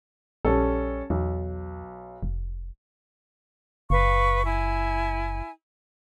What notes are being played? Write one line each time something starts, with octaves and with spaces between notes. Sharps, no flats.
A#1 G3 C#4 A4
B1 E2
F1
F#1 B4 F5 C#6
E4 G#5